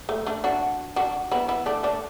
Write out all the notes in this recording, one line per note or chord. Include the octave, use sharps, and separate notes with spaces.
A3
A3 D4
D4 F#4
D4 F#4
B3 E4
B3 E4
A3 D4
A3 D4